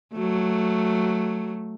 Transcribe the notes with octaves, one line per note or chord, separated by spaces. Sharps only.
F#3 A3